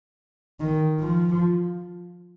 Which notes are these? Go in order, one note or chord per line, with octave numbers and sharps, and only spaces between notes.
D#3
F3